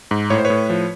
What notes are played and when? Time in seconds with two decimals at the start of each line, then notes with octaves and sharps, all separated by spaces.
0.11 G#2
0.30 A2 C#5
0.38 C5
0.45 B4 C#5
0.50 A2
0.70 F3